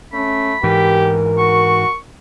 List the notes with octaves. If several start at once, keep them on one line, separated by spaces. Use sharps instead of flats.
A3 C#4 B5
G#2 E3 G4 A#4
F#4 C#6